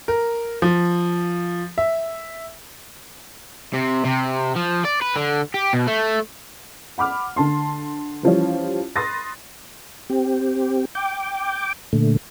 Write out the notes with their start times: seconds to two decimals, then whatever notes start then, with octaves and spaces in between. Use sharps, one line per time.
0.08 A#4
0.62 F3
1.78 E5
3.74 C3
4.05 C3
4.56 F3
4.85 D5
5.01 B4
5.16 D3
5.54 G4
5.73 B2
5.87 A3
6.98 F#5 B5 D6 F6
7.36 D3 A5 C6
8.23 E3 F3 G3 C#4
8.96 B5 C6 D#6 F#6 A6 A#6
10.10 C4 G4
10.95 G5 D6
11.93 A#2 D3 A3